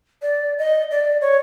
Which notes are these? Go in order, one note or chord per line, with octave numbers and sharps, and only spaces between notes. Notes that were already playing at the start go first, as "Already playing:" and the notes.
D5
D#5
D5
C#5